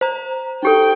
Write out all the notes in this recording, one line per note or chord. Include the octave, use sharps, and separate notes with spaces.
C5 A#5
D#4 G4 A4 G5